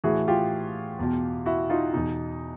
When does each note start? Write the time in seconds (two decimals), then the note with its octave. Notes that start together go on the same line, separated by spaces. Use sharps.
0.04 A2 E3 F#4 G#4
0.28 F4 G4
0.99 E2 B2
1.46 E4 F#4
1.70 D#4 F4
1.94 E2 B2 D#4